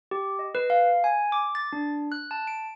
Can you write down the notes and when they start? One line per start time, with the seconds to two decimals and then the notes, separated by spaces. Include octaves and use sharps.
0.11 G4
0.39 D#5
0.55 B4
0.70 F5
1.04 G#5
1.32 D6
1.55 A6
1.73 D4
2.12 F#6
2.31 A5
2.47 D7